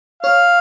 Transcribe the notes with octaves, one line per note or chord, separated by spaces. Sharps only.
C#5 F5